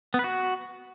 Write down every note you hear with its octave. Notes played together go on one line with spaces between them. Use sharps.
B3
B4
F#4